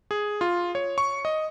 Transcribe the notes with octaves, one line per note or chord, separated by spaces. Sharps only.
G#4
F4
C#5
C#6
D#5